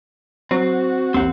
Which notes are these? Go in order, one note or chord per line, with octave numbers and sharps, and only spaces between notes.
F#3 C4 F#4
A1 D#2 C4 F#5